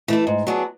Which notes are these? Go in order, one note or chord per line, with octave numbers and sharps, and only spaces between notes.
E3 A3 E4
G#2
F#3 B3 D4 G#4